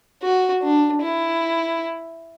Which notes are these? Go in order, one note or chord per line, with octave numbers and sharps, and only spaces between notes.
F#4
D4
E4